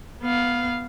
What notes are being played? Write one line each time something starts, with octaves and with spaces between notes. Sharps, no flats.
B3 F5